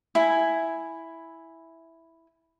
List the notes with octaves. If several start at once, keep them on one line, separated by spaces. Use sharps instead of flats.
E4 G#5